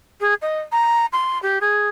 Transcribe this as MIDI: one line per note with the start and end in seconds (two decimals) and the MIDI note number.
0.21 0.34 68
0.42 0.61 75
0.72 1.06 82
1.13 1.41 84
1.43 1.59 67
1.61 1.89 68